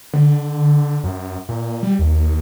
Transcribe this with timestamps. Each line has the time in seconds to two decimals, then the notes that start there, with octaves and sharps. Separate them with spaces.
0.13 D3
1.04 F#2
1.49 A#2
1.83 G3
1.99 D#2